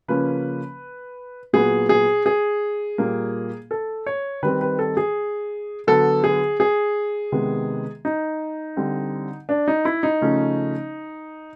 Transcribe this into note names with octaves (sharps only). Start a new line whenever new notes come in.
C#3 F3 A#3 C#4 B4
A#2 F#3 B3 G#4
G#4
G#4
A#2 G3 A#3
A4
C#5
D#3 G3 C4 B4
B4
A4
G#4
D3 F#3 B3 A4
G#4
G#4
C3 D#3 G#3 B3
D#4
D3 G3 C4
D4
D#4
E4
D#4
C#3 F3 A3 C#4